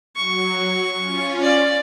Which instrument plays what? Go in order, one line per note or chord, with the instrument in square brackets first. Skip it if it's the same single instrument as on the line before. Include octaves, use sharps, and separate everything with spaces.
[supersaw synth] F#3 [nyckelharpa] C#6
[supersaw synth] C#4 F4
[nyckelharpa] D5